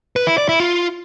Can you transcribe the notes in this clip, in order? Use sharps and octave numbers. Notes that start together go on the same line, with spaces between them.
B4
E4
D5
E4
F4